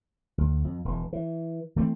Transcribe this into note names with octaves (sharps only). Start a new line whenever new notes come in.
D2
F2
E1 E3
E3
E3 A3 C4